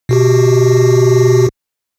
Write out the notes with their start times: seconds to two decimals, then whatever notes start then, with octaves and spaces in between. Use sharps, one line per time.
0.09 B2 F#4 G4